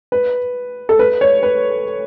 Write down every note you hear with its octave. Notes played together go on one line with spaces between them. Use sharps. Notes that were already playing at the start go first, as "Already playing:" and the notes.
B4
A4
B4
C#5
B4